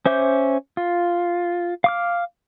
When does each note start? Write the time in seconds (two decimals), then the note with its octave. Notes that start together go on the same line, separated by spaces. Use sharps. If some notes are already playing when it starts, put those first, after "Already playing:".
0.06 C#4 C5 E5 D6 G6
0.77 F4
1.84 F5 D6 F6